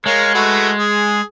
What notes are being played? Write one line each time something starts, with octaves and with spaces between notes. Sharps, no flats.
G#3 A#4 C#5 F5
A3 F#4 B4
G#4